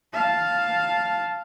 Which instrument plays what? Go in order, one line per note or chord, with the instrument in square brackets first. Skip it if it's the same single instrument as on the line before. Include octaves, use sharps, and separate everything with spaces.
[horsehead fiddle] F5 A5